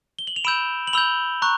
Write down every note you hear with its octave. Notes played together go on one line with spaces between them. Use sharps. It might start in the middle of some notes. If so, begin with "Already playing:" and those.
G7
F#7
F7
B5 E6 G6 D7 E7
F#7
B5 E6 G6 F7 G7
A#5 C#6 F#6